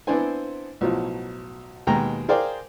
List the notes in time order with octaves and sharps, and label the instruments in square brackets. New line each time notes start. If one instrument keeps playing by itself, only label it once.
[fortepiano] B3 C4 D4 E4 C5 G#5
B1 A2 F3 F#3
D#2 B2 G#3 G5 A#5
G#4 A#4 C5 D5 F5 G5